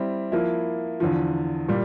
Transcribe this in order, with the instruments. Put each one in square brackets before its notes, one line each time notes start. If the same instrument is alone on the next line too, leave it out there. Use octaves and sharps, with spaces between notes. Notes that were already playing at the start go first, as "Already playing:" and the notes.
Already playing: [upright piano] G3 C4 E4
F3 A#3 E4
E2 D3 F3
A#2 G3